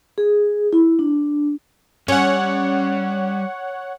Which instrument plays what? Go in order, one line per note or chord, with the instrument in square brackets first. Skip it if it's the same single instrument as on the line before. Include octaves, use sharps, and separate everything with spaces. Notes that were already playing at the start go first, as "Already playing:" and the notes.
[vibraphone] G#4
E4
D4
[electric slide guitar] G3 [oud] C#4 [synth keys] C#5 F#5